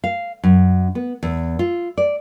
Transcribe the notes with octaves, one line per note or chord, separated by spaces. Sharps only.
F5
F#2
B3
E2
F4
D5